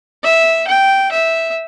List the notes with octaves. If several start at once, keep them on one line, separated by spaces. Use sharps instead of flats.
E5
G5
E5